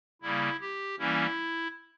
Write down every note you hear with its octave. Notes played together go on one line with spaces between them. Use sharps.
C#3 G3 A#3 E4
G4
E3 G3 A#3 C#4 E4